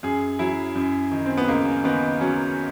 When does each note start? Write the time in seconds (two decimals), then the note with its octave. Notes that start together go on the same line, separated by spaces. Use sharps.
0.03 F#2 G#4
0.39 F#3 E4
0.76 F#2
1.11 D#3
1.26 C4
1.37 B3
1.48 C#2 A#3
1.84 D#3 B3
2.21 F#3 C#4